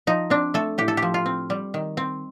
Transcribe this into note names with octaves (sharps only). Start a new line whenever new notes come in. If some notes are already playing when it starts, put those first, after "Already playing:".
F3 D#4
C4 D4
A3 A4
A2 G4
A4
G4
F3
F4
C4
G3
D#3
C4